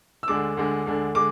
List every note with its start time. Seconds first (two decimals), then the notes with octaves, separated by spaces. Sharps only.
0.23 E6
0.28 D2 D3 G#3 D4 D6
0.57 D2 D3 G#3 D4
0.86 D2 D3 G#3 D4
1.15 D3 G#3 D6